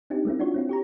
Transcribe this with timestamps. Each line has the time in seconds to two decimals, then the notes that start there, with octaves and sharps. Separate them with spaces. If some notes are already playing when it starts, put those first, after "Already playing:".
0.10 C4 D4 D#4 G4
0.25 G#3 A#3 C4 E4
0.40 D4 F4 F#4 C#5
0.54 C4 E4 F#4
0.69 G4 C#5 A#5